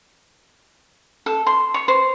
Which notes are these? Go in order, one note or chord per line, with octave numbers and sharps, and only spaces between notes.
A4
C6
C#5
C5